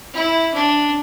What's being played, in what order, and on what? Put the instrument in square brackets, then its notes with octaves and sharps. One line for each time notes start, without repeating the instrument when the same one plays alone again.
[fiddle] E4
D4